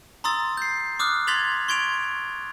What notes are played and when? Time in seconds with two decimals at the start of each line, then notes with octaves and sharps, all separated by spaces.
0.24 A#5 C6 D#6 E6 A6
0.57 G6 C7
0.99 D6 D#6 F6 F#6
1.27 C6 G#6 A6 B6 F7 F#7
1.68 C6 C#6 G#6 D7 F7